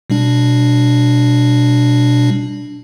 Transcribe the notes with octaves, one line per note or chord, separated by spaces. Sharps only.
B2 G3 D4